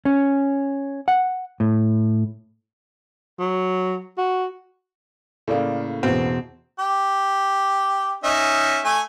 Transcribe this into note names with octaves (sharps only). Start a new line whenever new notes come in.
C#4
F#5
A2
F#3
F#4
A2 C#3 A#3 A4 D5 F5
E2 B2 C4
G4
C#4 D#4 E5
A3 G#5